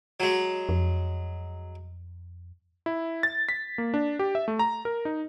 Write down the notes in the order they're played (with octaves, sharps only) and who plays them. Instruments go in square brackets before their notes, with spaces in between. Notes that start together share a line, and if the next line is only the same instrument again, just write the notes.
[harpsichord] F#3 G#3
[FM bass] F2
[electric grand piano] E4
A6
B6
A#3
D4
G4
E5
A3
A#5
A#4
D#4